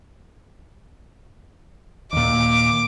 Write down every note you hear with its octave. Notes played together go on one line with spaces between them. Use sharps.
D#2 A#2 D6